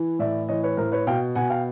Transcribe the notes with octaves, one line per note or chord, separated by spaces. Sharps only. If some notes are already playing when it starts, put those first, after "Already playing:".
Already playing: E3
A2 D5 E5
E3 C#5 D#5
B4 C#5
A2 A#4 C5
B4 C#5
B2 F5 G5
B2 F#5 G#5
F5 G5